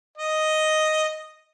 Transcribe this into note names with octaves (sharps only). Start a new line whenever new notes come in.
D#5